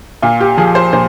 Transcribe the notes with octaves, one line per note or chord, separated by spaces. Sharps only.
A#2 F4
G4
F3 G#4
C5
A#2 C5